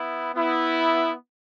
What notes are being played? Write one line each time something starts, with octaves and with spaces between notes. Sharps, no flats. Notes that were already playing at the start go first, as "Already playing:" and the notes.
Already playing: B3 E4
B3 E4